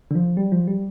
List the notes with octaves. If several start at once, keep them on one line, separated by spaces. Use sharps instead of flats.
D3
F3
G3
F3
G3